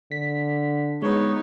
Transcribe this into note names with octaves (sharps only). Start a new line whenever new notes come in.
D3 B6
G#3 B3 D#4 B4 C#5